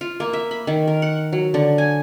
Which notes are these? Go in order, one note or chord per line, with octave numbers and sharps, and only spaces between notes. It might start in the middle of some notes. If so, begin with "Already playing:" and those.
F4
A#3
E5
B5
D#3
A#4
F#5
F#3
D3
G#5